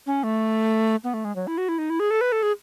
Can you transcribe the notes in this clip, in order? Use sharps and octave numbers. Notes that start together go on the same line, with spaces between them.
C#4
A3
B3
A3
G#3
F#3
E4
F#4
E4
D#4
E4
G#4
A4
B4
A4
G#4